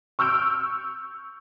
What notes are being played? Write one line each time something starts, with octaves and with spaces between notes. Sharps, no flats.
C#6 E6 F6 G6 D7